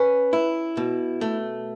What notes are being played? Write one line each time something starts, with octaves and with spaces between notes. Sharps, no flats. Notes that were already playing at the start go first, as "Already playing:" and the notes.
Already playing: C#4 B4
E4
B2
A3